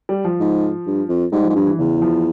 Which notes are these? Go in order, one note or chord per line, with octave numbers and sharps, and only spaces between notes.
G3
F3
G#2
G2
F2
G#2 G3
F3
G#2
G2 F3
E3
E2 C#3
E3
F3